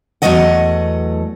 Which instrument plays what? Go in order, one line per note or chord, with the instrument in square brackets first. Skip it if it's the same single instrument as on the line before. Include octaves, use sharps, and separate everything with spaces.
[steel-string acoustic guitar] E2 E3 F#3 A3 D#5 F#5